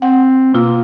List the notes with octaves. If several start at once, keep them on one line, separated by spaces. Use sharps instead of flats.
C4 F#5
B2 A#3 F4 E6